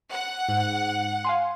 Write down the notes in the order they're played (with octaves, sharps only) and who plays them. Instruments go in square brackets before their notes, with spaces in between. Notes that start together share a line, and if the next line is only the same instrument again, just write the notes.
[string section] F#5
[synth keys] G#2
F5 G#5 C6